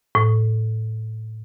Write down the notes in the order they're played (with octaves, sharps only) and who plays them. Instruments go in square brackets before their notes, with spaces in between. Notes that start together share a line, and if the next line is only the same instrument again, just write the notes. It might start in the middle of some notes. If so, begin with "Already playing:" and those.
[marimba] A2